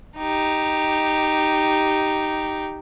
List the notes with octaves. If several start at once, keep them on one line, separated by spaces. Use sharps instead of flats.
D#4 G4